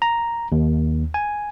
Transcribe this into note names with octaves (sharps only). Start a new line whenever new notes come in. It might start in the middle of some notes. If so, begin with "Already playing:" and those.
A#5
D#2
G#5